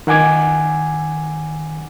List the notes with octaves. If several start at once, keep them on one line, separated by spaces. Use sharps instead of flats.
D#3 F#5 G#5 D6 G#6